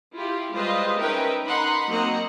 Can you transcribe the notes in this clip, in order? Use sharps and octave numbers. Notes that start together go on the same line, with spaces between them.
E4 F4 G4
G3 G#3 F4 B4 C5 D#5
C#4 D#4 A#4 B4 E5 G5
D#4 F#5 B5 C6
F#3 A#3 C4 D#5 F#5 A#5